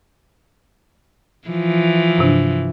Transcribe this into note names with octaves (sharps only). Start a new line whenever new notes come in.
E3 F3
G2 C3 D4